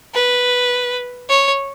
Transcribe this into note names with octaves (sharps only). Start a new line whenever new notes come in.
B4
C#5